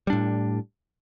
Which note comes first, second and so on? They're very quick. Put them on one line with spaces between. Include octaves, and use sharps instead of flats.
G3 D4 A2